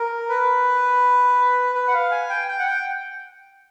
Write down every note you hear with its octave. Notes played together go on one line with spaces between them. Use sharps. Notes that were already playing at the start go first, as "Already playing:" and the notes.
Already playing: A#4
B4
B4
F#5
F5
G#5
G5
G5
F#5
G5